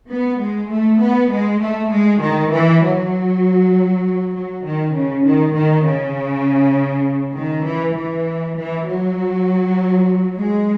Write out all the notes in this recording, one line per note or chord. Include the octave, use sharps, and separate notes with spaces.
B3
G#3
A3
B3
G#3
A3
G#3
D#3
E3
F#3
F#3
D#3
C#3
D#3
D#3
C#3
D#3
E3
E3
E3
F#3
G#3